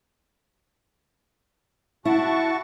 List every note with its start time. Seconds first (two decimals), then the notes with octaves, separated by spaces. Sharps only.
2.05 E4 F#4 A5 C#6